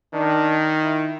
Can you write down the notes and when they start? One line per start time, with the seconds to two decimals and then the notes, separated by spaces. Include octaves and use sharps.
0.14 D#3 D4
0.83 E4